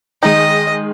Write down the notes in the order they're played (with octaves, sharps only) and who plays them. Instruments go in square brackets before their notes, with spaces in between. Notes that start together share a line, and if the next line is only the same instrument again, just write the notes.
[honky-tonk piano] D#3 G#3 [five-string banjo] D#4 [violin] D#5 [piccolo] A#6